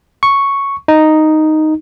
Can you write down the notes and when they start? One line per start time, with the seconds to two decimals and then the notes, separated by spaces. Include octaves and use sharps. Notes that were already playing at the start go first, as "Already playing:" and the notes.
0.23 C#6
0.88 D#4